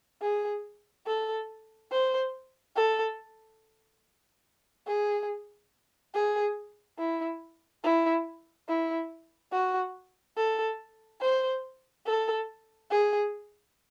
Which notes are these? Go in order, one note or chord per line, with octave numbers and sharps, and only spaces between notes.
G#4
A4
C5
A4
G#4
G#4
E4
E4
E4
F#4
A4
C5
A4
G#4